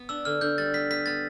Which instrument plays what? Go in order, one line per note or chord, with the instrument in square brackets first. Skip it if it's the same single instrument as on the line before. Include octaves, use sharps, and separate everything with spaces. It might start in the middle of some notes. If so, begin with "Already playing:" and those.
Already playing: [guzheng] B3
[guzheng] D4 [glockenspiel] E6
[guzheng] D3 [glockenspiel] F6
[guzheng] D3 [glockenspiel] G6
[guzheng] G3 [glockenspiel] A6
[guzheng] B3 [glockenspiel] B6
[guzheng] B3 [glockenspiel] B6
[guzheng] B3 [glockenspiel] A6